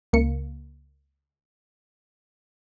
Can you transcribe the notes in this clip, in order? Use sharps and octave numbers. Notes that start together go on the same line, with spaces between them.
C#2 A#3 C#7